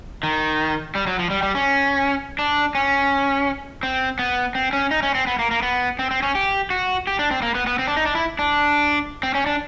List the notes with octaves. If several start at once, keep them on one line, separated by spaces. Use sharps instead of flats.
D#3
G3
F#3
F3
G3
G3
C#4
D4
C#4
C4
B3
C4
C#4
D#4
C#4
C4
B3
A#3
A#3
B3
C4
C4
C#4
G4
F#4
G4
D4
C4
A#3
B3
B3
C4
D4
D#4
D4
E4
D4
C4
C#4
D4